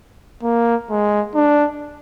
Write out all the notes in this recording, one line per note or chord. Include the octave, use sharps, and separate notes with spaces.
A#3
G#3
D4